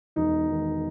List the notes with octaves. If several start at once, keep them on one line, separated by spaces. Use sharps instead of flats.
E1 D#4
D#3